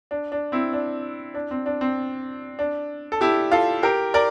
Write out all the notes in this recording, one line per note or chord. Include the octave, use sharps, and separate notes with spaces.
D4
D4
C4 E4
D4
D4
C4
D4
C4
D4
A4
E4 G4
F4 A4
G4 A#4
A#4 D5